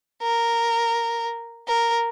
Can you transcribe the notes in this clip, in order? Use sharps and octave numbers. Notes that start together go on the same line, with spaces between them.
A#4
A#4